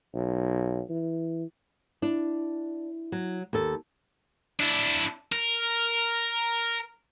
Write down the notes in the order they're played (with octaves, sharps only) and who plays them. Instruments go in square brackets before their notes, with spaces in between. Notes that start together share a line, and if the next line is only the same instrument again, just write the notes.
[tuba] B1
E3
[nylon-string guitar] D4 [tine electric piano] E4
[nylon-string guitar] F#3
D#2 A4
[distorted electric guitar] D4 E4
A#4